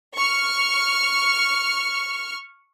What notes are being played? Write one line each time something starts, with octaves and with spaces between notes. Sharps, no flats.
C#6 F6